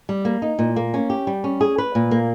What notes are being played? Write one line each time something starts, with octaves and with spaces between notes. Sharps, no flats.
G3
A#3
D#4
A#2
A#3
C#4
G4
G3
C#4
G#4
B4
A#2
A#3